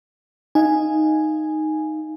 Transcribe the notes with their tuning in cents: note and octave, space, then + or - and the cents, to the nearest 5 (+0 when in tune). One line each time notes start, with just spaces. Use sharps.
D#4 +0 F5 -15 G#5 +0